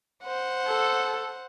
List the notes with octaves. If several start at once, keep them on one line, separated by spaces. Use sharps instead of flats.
C5 F#5
A4